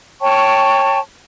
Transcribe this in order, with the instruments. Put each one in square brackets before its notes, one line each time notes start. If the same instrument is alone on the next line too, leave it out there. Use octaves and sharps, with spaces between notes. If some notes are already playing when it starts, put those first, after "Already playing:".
[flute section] C#5 G5 A5 C#6